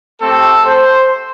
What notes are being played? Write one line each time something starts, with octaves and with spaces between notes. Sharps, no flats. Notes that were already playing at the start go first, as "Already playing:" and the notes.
A3 C4 G4 A4
C5